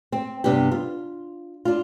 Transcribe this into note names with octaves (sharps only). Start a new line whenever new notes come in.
C4
G2 C3 B3 D4 G4
F4
D4 F4